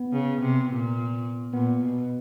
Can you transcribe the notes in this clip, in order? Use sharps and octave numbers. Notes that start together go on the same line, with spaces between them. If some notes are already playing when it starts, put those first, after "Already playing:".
Already playing: B3
C#3
C3
A#2
A#2 B3
B2